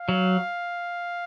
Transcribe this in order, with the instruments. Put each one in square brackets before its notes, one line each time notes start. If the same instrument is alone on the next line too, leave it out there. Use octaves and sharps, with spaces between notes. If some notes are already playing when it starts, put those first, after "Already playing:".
Already playing: [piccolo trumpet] F5
[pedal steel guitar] F#3